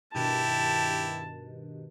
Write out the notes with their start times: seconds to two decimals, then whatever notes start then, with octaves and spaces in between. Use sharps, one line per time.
0.14 G2 B2 D#3 E4 G4 A5